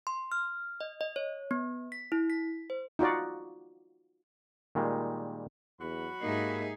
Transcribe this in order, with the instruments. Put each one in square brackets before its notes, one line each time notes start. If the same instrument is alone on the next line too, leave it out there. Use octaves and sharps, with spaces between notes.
[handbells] C6
F6
D#5
D#5
C#5
B3
B6
E4
B6
C5
[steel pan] D#4 F4 F#4 D5
[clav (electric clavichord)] A#2 D#3 G3 G#3
[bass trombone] E2 [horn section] F#3 F#4 B5
[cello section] G#2 G4 E5 [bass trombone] A#3 [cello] D#4 G#4